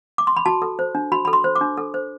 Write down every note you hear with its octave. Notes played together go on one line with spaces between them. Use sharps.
D6
C6
B5
F#4 A5
A4
C5
D4
F#4 B5
A4 B5
C6
C5
D6
D4
A4
C5